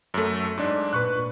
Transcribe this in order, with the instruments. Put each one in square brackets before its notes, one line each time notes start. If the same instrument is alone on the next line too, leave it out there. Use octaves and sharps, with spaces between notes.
[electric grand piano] F#2 A3
G#2 D4
[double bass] A#2 [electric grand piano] B4 C#6 F#6